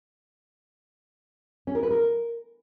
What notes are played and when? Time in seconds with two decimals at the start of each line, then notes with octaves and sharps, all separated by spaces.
1.67 C#4
1.75 A#4
1.83 B4
1.90 A#4